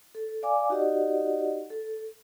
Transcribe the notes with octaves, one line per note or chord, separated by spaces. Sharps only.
A4
D5 F5 G#5 D6
D#4 F#4 G4 D5 D#5 F#5
A4